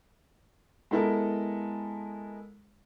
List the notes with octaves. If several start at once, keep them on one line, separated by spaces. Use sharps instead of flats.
G#3 B3 E4 A4 A#4